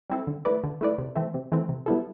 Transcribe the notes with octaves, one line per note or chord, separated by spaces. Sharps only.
G3 C4 E4 A4
D3
A3 E4 B4 D5
D3
A3 E4 B4 D5
C3
E3 A3 C4
C3
E3 A3 C4
C3
G3 B3 E4 A4